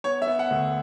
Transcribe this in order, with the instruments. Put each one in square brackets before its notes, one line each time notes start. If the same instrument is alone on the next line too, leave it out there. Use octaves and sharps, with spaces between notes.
[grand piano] B3 C#5
E5
B3
F#5
D2